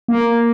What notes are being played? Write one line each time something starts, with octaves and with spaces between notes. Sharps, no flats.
A#3